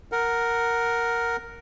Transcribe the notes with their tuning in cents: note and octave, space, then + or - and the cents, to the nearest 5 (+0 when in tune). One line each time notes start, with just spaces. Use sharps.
A#4 +0 F#5 +0